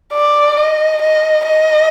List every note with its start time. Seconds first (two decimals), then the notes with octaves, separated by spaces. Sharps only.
0.13 D5
0.57 D#5
1.02 D#5
1.47 D#5